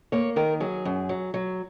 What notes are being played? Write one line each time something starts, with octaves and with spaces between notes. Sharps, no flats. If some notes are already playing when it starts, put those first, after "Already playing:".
A#3 C#5
D#3 A#4
F#3 G#4
F#2
F#3
F#3